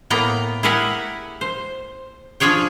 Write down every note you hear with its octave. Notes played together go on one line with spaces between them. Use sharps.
A2 A#3 B3 G5 A#5
E4 G4 G#4 A#4 E5 F#5
C5
F3 D4 F4 G#4 C#5 G5